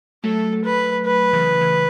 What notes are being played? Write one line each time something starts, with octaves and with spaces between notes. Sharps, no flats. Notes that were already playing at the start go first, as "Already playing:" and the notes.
F#3 A3 A4
B4
B4
C#3 E3
C#3 E3